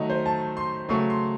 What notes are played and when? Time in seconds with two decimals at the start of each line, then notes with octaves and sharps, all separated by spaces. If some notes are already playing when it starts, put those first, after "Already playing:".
Already playing: D#3 F#3 A3 D#5
0.10 C5
0.26 A5
0.57 C6
0.89 C#3 F#3 A3 C#6
1.10 C6